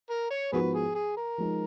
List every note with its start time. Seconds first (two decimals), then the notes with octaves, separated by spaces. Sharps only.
0.10 A#4
0.31 C#5
0.52 G#2 F3 B3 F#4 G#4 A#4 B4
0.74 G#4
0.95 G#4
1.17 A#4
1.38 F3 G#3 D#4